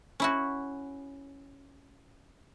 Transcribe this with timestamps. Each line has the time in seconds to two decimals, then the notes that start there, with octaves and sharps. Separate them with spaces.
0.20 C#4 E4 F#4